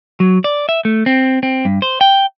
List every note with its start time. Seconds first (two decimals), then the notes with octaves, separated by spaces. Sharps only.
0.20 F#3
0.44 D5
0.69 E5
0.85 A3
1.06 C4
1.43 C4
1.65 G2
1.82 C5
2.01 G5